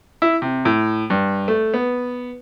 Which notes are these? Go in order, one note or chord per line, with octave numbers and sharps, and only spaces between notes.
E4
C3
A2
G2
A3
B3